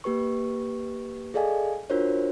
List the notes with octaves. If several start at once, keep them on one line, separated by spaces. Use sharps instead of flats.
A#3 G4 B4 C#6
G#4 A4 D5 D#5 F5 G#5
D4 F4 F#4 A#4 C5 C#5